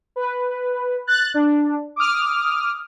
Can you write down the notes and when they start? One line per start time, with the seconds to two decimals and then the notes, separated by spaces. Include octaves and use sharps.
0.16 B4
1.07 F#6 A6
1.34 D4
1.96 D6 D#6 F6